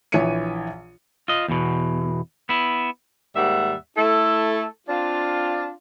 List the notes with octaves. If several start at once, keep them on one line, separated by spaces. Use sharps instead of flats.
A#1 E3 C#5 E5 C#7 D#7
F4 D#5
E2 B2
B3 E4
D#2 G#2 G3 E5 F#5
A3 E4 A4
C4 D4 F4